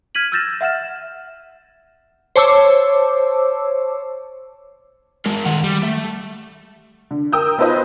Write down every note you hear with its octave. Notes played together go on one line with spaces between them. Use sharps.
F6 G#6 B6 D#7 F#7
E6 F6 G6 A6 A#6 E7
E5 F#5 F6 E7
C5 C#5 A5 D6 E6
G#3 A#4
D#3 F#5
G3
A3
D3
A#4 G5 D#6 E6 G6
B3 D#4 F4 B4 C5 D#5